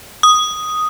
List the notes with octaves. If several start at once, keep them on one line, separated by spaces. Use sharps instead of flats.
D#6